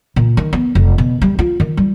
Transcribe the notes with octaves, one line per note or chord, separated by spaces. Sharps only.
A#2
D#3
B3
F1
B2
G3
F4
D#3
G3